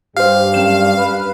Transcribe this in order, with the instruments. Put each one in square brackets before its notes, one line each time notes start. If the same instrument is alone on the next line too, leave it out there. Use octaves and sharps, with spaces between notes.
[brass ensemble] G2 G3 [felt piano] G4 C5 [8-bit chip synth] F5
[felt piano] F#2 G5 E7
[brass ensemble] B4